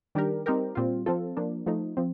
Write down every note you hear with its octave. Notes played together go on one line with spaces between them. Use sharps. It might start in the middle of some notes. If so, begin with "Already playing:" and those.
D#3 G3 D4 G4 A#4
G3 C4 D#4 G4 A#4
A#2 G3 C4 F4
F3 C4 F4 A4
F3 A#3 D4
F3 A3 D#4
F3 C4